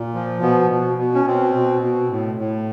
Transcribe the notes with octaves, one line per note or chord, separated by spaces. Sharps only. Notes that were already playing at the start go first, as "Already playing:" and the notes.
Already playing: A#2
F3
B2 B3
B2
B2
C#4
B2 C4
B2
B2
A2
A2